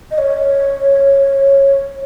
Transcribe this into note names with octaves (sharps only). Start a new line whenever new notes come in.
D#5
C#5